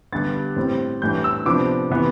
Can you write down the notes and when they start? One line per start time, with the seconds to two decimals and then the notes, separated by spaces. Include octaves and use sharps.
0.12 G2 D3 G3 B3 D4 A6
0.56 A2 G3 C4
1.02 A2 E3 G3 D4 G6
1.24 E6
1.46 C3 F3 B3 D4 D6
1.90 C3 E3 B3